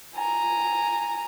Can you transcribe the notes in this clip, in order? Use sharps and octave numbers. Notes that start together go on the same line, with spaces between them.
G#5 A#5